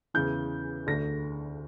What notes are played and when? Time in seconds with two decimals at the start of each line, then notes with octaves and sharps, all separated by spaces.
0.14 E2 C#3 E3 G6
0.87 D2 D3 A#6